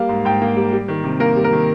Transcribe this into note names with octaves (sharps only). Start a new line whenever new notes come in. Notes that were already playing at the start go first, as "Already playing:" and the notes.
Already playing: G3 A#3 F5
G#2
G#2 G5
A#3
G3
G3
D#3
C3
A#3 A#4
G3
A#4
D#3